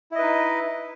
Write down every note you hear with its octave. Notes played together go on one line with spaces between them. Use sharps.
D#4 E4 B4 D#5